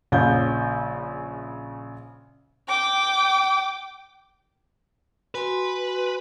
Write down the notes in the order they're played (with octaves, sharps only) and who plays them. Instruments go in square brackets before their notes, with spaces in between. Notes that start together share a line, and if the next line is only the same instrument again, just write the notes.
[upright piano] A#1 C#3 G6
[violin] G5 D6
[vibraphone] F#4 G#5 C6 [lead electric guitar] B4